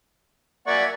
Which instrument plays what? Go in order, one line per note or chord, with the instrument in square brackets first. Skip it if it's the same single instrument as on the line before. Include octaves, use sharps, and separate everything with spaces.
[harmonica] A#3 F#5 C#6 [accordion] D5 [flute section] E5 G#5 G#6